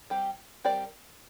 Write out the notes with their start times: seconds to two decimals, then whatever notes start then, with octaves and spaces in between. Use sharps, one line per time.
0.10 G3 C4 G4
0.64 G3 C4 G4 A#4 D5